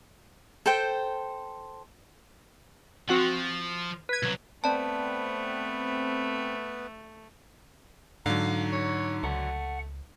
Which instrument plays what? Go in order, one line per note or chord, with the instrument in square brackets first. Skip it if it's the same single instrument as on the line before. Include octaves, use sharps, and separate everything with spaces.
[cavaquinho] A4 C5 G5
[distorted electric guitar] F3 [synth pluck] C4 F#4 F#5
[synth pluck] B4 G#6
[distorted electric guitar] C2 F#3
[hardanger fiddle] A3 [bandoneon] B3 B4 [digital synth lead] C4 [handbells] D5 A5
[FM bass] G#2 [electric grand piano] D3 F#3 [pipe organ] D#4 [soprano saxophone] F5
[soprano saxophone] C#5
[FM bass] C#2 [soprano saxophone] A3 [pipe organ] F#5